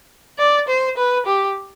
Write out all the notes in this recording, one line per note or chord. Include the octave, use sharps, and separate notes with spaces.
D5
C5
B4
G4